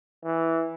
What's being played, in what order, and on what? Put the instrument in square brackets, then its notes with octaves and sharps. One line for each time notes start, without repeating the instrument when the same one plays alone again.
[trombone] E3